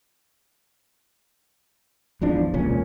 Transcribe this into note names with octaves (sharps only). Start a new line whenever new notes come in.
G#1 E2 F3 D4
E1 C#2 A#2 C#4